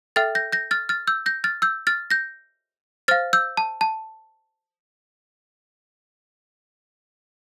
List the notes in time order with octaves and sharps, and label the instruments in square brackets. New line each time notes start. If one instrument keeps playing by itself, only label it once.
[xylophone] A4 E5 G5 F6 A6
G6 A#6
G6 A#6
F6 A6
F6 A6
E6 G6
G6 A#6
F6 A6
E6 G6
F6 A6
G6 A#6
C5 F5 F6 A6
E6 G6
A5
A5